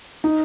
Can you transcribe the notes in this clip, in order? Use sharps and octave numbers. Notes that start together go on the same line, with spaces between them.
D#4